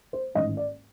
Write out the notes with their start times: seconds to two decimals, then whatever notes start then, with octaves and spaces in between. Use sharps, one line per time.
0.13 C5
0.35 A1 G#2 D#3 D#5
0.57 D5